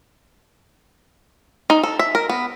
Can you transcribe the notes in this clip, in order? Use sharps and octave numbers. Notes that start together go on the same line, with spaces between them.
D#4
A4
E5
A#4
B3